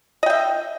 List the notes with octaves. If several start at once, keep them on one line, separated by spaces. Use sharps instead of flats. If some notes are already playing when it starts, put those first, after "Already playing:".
D#5 E5 G5